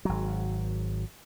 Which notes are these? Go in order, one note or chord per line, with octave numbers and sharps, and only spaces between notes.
G#1 F#3